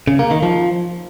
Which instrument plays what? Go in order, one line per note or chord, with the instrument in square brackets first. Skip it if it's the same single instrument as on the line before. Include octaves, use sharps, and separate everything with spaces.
[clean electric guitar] C#3
A#3
D#3
F3